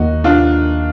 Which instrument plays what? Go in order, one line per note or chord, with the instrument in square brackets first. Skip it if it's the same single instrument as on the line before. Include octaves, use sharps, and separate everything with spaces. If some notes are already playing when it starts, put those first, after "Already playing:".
Already playing: [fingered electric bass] D#2 D#3 A#3 [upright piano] D#4 F#4
[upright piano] D4 F4